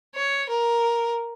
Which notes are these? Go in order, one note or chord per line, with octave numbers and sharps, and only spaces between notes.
C#5
A#4